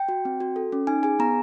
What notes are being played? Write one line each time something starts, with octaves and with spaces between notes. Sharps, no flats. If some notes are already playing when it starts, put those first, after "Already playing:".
Already playing: G5
F#4
C4
F#4
A4
C#4
D#4 G#5
G#4 G#5
B3 A#5